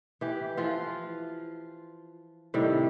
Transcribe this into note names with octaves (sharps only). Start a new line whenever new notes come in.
E3 G4
E3 F3 F4
A2 C3 D#3 G3